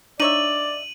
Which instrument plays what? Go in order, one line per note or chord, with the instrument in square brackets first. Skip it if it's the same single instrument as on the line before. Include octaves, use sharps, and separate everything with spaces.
[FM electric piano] D4 [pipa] D#4 C#5 E5 [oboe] D5 [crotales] D#7 F#7